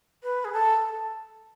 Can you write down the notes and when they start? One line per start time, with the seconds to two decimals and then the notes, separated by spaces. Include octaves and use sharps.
0.23 B4
0.45 G#4
0.53 A4